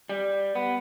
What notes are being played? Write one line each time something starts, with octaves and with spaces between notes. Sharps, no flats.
G3
B3